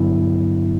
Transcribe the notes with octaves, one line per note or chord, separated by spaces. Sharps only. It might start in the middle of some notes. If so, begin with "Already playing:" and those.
Already playing: G2 D3 F#3 B3 E4